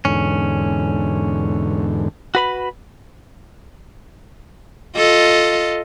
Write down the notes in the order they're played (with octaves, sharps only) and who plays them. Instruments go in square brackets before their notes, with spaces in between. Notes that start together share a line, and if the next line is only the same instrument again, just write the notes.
[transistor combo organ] E2 G#2 D3 [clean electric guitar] C#4
[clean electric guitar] F#4 B4 B5
[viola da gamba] F4 A4 D#5